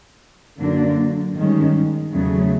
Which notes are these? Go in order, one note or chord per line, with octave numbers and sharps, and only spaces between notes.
F#2 D3 F#3 A#3 D4
G2 D#3 G#3 C#4
E2 C#3 F#3 A3